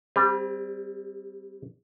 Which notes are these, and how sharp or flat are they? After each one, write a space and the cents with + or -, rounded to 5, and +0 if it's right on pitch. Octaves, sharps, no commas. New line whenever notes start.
G3 -5 C4 +0 G4 +40